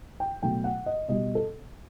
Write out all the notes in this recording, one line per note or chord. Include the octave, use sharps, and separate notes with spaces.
G5
B2 F#3 A3 G5
F#5
D#5
B2 G3 D#5
A4